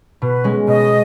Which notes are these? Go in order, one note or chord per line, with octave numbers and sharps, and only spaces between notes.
B2 B4
G#3 C#4
B2 D#5